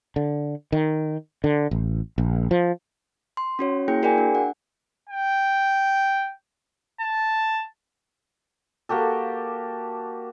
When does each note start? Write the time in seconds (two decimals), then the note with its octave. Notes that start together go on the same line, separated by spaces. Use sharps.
0.16 D3
0.72 D#3
1.44 D3
1.71 A1
2.18 A#1
2.51 F3
3.37 C6
3.59 C#4 F#4 C#5
3.88 A#3 E4 G#4 G5 G6
4.02 F#4 G#4 A#4 D5 G5 G#5
4.18 D4
4.35 F#5
5.09 G5
7.01 A5
8.89 A#3 F#4 G4 A4